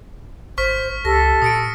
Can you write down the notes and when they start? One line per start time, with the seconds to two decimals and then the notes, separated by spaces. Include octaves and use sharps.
0.58 G#1 C5 C#6 F6 B6
1.05 C#2 G4 A4 A#6
1.42 A#2 D#6 C#7 D7